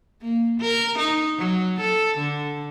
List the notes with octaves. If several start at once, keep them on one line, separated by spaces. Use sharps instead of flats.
A#3
A#4
D#4
F#3
A4
D3